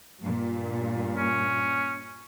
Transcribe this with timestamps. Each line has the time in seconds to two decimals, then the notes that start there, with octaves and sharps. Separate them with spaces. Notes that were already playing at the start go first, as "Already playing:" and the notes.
0.21 G2 A#2
1.17 C#4